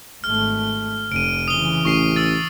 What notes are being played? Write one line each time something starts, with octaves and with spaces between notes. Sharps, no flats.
G#1 A3 F6
F1 D7 D#7
C#3 E3 D#6 G7
A1 C#6 C7 D#7
E6 A6